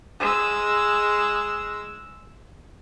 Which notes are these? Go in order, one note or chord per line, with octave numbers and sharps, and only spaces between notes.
G#3 E6